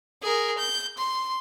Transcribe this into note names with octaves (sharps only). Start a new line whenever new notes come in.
G#4 A#4
G6
C6